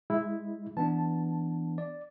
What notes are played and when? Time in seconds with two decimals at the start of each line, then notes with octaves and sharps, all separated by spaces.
0.10 G#3 E4
0.77 E3 B3 D4 A5
1.78 D5